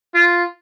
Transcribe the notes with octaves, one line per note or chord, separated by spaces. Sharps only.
F4